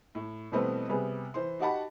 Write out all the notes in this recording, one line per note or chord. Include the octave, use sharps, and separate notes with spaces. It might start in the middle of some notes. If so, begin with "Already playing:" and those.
A2
B2 E3 G3 A3 B3 C4
C3 G3 B3 G#4
E3 C5 C6
D#4 F#4 G4 F#5 A5 B5